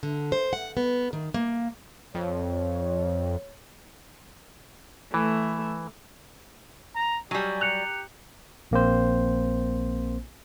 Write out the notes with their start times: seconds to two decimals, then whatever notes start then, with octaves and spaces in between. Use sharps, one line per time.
0.03 D3
0.32 C5
0.53 F#5
0.77 B3
1.13 D#3
1.34 A#3
2.15 F2 C#5
5.14 E3 A3
6.96 A#5
7.31 F#3 G3 G4 G#5 D#7
7.61 A#5 F#6 C#7 F7
8.71 A#1 A#3 C4 C5